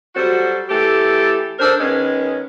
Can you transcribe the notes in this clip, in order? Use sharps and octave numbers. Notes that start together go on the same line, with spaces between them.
F#3 G3 F#4 A4 C5
E3 A3 G4 A4
D4 A4 A#4 C5
D#3 G#3 B3 C#4